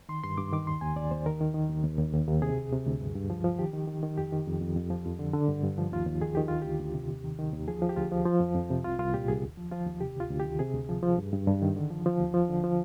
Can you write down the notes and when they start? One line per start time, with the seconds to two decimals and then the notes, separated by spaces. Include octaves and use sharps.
0.09 D#3 C6
0.24 G2 C6
0.38 G2 D6
0.53 D#3 D6
0.67 D#2 C6
0.81 D#2 G#5
0.96 D#2 D5
1.11 D#2 C5
1.26 D#3 A#4
1.41 D#3
1.54 D#3
1.70 D#2
1.83 D#2
1.98 D#2
2.14 D#2
2.28 D#2
2.42 C3 G#4
2.56 D2
2.72 C3
2.86 D2
3.01 G2
3.15 G2
3.30 F3
3.44 F3
3.59 D#3 G4
3.74 D#3
3.88 D#3
4.03 D#3
4.17 F2 G4
4.32 D#3
4.47 F2
4.61 F2
4.76 F2
4.90 F3
5.05 F2
5.19 D3
5.34 D3
5.48 G2
5.64 G2
5.78 F3
5.92 D#2 F4
6.07 D#2
6.21 D#3 G#4
6.35 D#3 G4
6.48 D2 F4
6.62 D2 G4
6.80 D2
6.94 C3
7.09 D#2
7.24 D#3
7.39 D#3
7.53 D#2
7.68 F3 G#4
7.82 F3
7.89 G4
7.97 D2 F4
8.12 F3
8.26 F3
8.40 F2
8.55 F2
8.70 C3
8.84 C2 F4
8.99 C2 F4
9.14 A#2 G4
9.28 C2 G#4
9.43 D#2
9.57 F3
9.72 F3 F4
9.86 D#2
10.01 C3 G4
10.16 D2 F4
10.30 D2
10.40 G4
10.45 D#3
10.59 C3 G#4
10.74 D2
10.89 F3
11.03 F3
11.18 G2
11.33 G2
11.47 G2
11.62 D#3
11.76 D3
11.91 F3
12.06 F3
12.20 D#2
12.34 F3
12.49 D3
12.64 F3